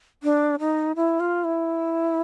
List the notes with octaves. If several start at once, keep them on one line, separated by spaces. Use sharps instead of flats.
D4
D#4
E4
F4
E4